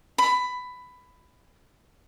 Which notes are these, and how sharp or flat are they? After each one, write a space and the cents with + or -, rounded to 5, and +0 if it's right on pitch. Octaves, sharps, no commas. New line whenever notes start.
B5 +15